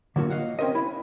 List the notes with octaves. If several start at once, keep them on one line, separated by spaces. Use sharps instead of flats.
D3 F#3 A#3 F4 F#4
D#5 F5 F#5
C4 C#4 A#4 C5 D#5
E4